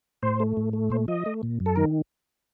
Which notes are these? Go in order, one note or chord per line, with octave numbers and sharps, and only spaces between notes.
A2 C5
A3
A2
A3
A#2 C5
F3 D#5
A3
A#2
F#2
A4
D#3 A#4